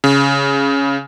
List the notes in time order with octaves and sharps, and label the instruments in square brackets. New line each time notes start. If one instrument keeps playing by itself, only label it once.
[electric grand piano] C#3